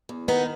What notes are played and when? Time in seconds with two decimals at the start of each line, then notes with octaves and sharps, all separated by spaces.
0.09 E2
0.28 D#3 B3 D#4